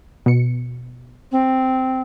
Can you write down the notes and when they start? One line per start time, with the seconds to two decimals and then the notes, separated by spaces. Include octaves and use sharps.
0.26 B2 C#7
1.31 C4